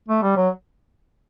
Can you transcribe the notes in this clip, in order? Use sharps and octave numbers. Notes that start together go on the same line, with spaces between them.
A3
G3
F#3